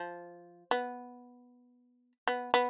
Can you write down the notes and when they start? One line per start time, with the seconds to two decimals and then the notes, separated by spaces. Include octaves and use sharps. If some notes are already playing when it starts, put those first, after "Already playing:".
Already playing: F3
0.71 B3
2.28 B3
2.54 B3